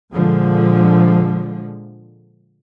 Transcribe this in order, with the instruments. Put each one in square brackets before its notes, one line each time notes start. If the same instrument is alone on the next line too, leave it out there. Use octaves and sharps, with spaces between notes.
[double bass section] A#2 D3 F3 G#3